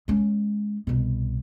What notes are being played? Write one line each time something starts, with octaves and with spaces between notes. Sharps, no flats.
G#3 C#4
C2 B2